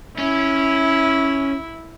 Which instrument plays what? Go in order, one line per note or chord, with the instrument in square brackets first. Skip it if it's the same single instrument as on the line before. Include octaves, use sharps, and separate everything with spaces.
[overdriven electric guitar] C#4 [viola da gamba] E4